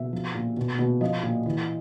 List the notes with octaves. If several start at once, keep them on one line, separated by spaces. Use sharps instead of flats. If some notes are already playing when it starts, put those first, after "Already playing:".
Already playing: B2 E5
F3
A#2
B2
B2
F3 D#5
A#2
E3